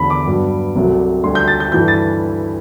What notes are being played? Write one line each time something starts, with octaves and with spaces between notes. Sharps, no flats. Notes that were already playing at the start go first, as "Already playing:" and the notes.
Already playing: E2 D3 A3 B5
D6
G2 F#3 B3
C2 C3 F#3 A3
D2 D3 G3 C6
G6
A6
G6
G2 E3 A3 G6
A6